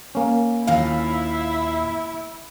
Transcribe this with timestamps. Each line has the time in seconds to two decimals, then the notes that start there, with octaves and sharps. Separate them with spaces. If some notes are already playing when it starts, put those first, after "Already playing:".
0.15 A#3 C#4
0.67 D#2 A#2 D#4 E4 F5